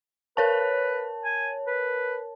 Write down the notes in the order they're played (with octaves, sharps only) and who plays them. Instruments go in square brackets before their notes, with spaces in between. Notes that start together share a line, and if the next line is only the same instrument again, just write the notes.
[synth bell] A#4 C#5 A5 [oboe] B4
[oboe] G#5
B4